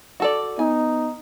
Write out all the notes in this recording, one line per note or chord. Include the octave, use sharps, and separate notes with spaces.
F#4 A4 D5
B3 D#4 G#5